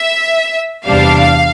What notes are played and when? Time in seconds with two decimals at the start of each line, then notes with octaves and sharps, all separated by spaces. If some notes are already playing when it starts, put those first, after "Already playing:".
Already playing: E5
0.87 E2 C3 G3 D4 F5